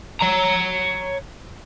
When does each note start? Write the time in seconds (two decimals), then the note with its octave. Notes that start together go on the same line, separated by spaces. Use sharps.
0.21 C#5 A#5